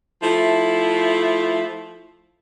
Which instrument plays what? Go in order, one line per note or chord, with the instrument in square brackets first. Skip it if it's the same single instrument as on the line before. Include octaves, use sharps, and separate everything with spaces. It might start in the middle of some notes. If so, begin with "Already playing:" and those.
[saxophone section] F3 A3 E4